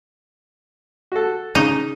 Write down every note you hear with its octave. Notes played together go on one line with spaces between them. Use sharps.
F#4 A4
C#3 D#4